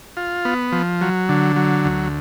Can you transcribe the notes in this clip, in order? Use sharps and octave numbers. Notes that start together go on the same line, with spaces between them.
F4
B3
F3
F#3
D3
F#3
D2